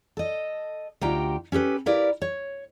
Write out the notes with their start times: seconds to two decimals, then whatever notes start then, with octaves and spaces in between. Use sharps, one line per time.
0.17 A4 D#5
1.01 D2 D#4 F4 G4 G5 A#5
1.52 C#4 G4 A4 B4
1.86 E4 G4 A#4 B4 D5 F5
2.22 C#5